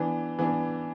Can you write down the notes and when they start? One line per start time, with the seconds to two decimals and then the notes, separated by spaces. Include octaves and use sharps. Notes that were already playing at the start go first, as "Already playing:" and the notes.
Already playing: E3 B3 D4
0.39 E3 B3 D4